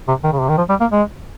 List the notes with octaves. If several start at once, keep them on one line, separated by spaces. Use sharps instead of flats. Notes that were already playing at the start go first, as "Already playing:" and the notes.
C3
D#3
C#3
C3
D#3
F3
G3
A#3
G#3